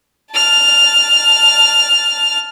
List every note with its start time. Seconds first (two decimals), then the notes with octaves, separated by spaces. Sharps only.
0.32 A5 F6